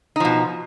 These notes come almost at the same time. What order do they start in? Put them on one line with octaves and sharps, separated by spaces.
D#4 F3 B2